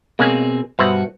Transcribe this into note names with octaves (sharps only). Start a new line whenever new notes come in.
B2 G#3 A#3 C4 C#4 G#4
G2 B2 F#4 C5 E5